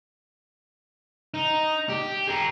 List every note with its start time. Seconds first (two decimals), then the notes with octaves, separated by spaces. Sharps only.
1.34 D#4
1.89 G4
2.27 G#4 A#4